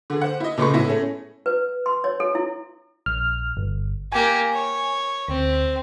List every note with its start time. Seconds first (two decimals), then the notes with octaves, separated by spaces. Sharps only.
0.10 D3 G#4
0.21 C5 F#5
0.40 E4 D#5
0.58 A#2 C#3 G#3 A3 B4 C#6
0.74 A2 B3 E4 A#6
0.89 A3 C#4 G#4
1.46 B4
1.86 C6
2.04 C#5
2.20 A4
2.35 E4
3.06 A#1 F6
3.57 G1
4.12 A#3 G4 G#5
4.53 C#5
5.28 D2 C4